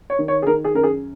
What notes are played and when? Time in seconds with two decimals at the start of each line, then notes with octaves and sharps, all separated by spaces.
0.10 C#5
0.19 D#3
0.28 C#5
0.42 G#4
0.47 D#3 A#4
0.64 G#4
0.74 F#2 A#4
0.83 G#4